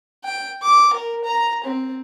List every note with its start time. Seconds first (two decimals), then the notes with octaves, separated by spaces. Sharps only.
0.25 G5
0.62 D6
0.93 A#4
1.24 A#5
1.64 C4